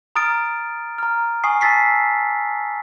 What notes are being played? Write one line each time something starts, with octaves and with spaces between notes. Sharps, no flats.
A#5 D#6 F6 A6 D7
A#5 F6
G#5 C#6 D#6 C7
A5 E6 A6 B6 C7